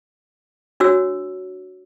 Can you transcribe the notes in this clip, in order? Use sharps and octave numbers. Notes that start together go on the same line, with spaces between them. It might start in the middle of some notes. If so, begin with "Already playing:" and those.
D4 F#4 C#5 E6